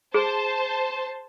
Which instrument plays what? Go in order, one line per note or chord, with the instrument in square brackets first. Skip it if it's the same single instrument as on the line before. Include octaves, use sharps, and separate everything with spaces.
[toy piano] G#4 [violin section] C5 A5